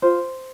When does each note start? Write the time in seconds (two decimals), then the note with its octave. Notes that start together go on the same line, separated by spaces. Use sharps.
0.02 F4 C5